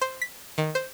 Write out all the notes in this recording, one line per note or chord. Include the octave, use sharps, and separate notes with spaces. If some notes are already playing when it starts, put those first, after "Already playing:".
C5
B6
D#3
C5